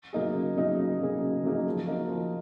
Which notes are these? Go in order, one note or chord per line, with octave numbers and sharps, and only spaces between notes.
F#3 A#3 D#4 G#4
C#3
F#3 A#3 D#4 G#4
C#3
F#3 A#3 D#4 G#4
C#3
F#3 A#3 D#4 G#4
F3
A#3 D#4 F#4
F3